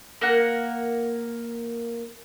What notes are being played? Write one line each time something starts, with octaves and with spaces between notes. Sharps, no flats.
A#3 A#4 F#5